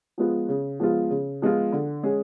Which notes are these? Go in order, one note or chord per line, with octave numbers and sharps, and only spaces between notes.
F3 G#3 B3 F4
C#3
F3 G#3 B3 F4
C#3
F3 G#3 B3 F4
D3
G#3 C#4 G#4